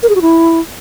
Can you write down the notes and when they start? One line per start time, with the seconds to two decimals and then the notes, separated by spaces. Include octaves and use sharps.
0.03 A#4
0.09 G#4
0.16 F#4
0.22 E4